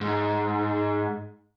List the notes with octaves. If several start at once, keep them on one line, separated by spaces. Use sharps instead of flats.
G#2